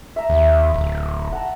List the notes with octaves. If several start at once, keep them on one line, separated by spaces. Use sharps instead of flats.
E5 A#5
D#2
D1
F#5 A5 A#5